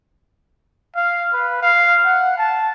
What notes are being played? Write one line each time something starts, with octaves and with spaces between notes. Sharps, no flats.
F5
B4
F5
F#5
A5